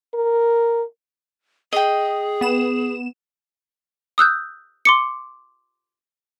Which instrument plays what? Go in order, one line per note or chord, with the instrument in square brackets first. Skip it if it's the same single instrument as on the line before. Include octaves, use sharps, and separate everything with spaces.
[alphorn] A#4
[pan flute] G#4 [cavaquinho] D#5 G5
[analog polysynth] B3 E7
[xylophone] D#6 E6 F#6 G6
C6 D6 C#7